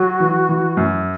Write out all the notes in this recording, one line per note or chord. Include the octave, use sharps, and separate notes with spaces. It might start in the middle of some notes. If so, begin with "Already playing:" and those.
Already playing: F#3 F#4
E3
E3
F#2